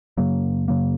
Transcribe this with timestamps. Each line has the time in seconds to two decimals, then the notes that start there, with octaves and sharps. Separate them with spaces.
0.17 F#2 C#3 F#3 A#3
0.68 F#2 C#3 F#3 A#3